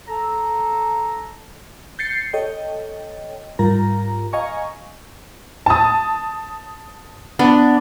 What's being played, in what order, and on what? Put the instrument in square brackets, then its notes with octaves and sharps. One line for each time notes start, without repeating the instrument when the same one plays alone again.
[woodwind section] A4 A#5
[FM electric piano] G6 A6 C7 C#7
A4 C#5 D#5 G5
G#2 G3 F4 A#4 A#5
D#5 F5 G#5 A#5 C#6
[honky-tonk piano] A5 D#6
[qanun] B3 D4